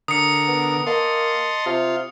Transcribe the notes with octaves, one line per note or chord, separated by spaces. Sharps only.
D3 A#4 D#6 C#7
B3
A#3 D#5 A5 C6
C3 F4